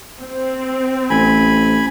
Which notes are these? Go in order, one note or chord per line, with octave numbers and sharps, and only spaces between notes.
C4
A1 G#5 B5